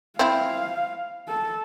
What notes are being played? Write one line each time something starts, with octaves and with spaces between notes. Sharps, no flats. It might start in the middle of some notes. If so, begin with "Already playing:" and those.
C4 E4 F5
A4